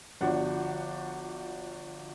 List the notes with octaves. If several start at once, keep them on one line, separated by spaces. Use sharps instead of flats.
G1 F3 D4 F#4 F#5